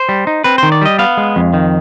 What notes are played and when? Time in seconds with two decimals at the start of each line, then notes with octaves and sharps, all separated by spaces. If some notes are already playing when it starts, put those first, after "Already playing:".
Already playing: C5
0.09 G3
0.27 D#4
0.44 C4 B4
0.58 D#3 C5
0.72 D5
0.82 G3 D#5
0.99 B3 F5
1.17 G#3
1.36 F2
1.54 D#3